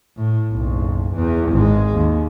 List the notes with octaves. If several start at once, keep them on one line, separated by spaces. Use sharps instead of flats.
A2
F#1 B1
E2 E3
G#1 G#3
D#2